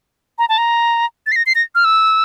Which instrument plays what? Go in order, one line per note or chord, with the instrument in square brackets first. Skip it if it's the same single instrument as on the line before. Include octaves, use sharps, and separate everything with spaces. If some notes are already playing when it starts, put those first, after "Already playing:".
[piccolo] A#5
A5
A#5
A6
C7
A#6
C7
A#6
F6
E6